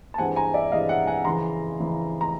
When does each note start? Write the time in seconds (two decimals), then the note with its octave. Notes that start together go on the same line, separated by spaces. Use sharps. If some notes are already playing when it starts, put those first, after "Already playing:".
0.14 A5
0.18 G2 E3 G#3 C4 F#5 G#5
0.36 G#5 A#5
0.54 D5 E5
0.72 G2 E3 G#3 C4 D#5 F5
0.89 E5 F#5
1.07 F#5 G#5
1.25 F2 C#3 E3 A#5 C6
1.79 F2 C#3 E3
2.21 A#5